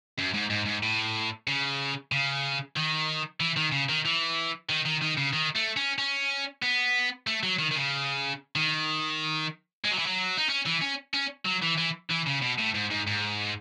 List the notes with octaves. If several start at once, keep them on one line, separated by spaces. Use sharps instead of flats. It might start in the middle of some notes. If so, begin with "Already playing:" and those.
F#2
G#2
G#2
G#2
A2
C#3
C#3
D#3
E3
D#3
C#3
D#3
E3
D#3
D#3
D#3
C#3
D#3
A3
C#4
C#4
B3
A3
F#3
D#3
D#3
C#3
D#3
G#3
F#3
E3
F#3
D#4
C#4
E3
C#4
C#4
F#3
E3
E3
E3
C#3
B2
A2
G#2
G#2
G#2